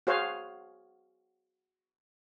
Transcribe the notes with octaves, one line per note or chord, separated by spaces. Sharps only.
F#4 G#4 C5 C#5 F5